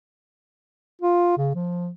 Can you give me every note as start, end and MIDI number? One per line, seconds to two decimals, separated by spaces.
1.02 1.36 65
1.37 1.53 49
1.55 1.89 53